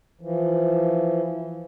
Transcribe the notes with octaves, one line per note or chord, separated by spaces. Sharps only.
E3 F3